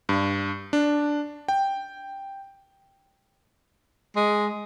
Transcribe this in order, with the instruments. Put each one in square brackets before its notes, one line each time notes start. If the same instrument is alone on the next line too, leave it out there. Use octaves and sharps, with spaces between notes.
[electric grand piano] G2
D4
G5
[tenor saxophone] G#3